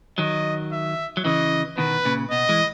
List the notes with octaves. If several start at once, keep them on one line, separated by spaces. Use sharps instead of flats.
D#3 F#3 D#5
E5
F#3
C#3 E3 D#5
B2 D#3 B4
A#2 C#3
B2 D#5
E3 G#3